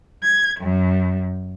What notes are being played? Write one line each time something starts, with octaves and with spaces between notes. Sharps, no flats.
G#6
F#2